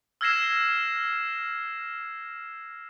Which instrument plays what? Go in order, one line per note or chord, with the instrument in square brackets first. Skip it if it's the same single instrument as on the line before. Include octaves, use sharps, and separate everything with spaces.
[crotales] E6 F6 G#6 A#6 C7 E7